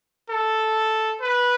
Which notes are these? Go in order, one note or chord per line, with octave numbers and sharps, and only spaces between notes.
A4
B4